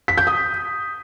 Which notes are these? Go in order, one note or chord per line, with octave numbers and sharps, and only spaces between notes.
B6
G6
D#6